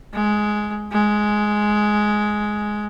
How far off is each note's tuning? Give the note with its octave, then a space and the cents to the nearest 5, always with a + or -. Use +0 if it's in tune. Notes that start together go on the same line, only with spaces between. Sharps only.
G#3 +10
G#3 +10